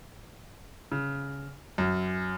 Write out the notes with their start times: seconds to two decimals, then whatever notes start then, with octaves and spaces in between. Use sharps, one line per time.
0.92 C#3
1.78 F#2